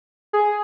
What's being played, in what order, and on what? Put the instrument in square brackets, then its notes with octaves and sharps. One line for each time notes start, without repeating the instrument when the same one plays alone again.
[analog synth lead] G#4